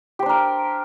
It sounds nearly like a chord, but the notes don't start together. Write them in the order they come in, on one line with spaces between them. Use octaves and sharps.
G4 C5 D4 A#4